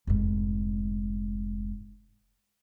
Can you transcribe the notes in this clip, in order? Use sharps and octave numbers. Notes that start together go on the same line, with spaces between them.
F1 G#2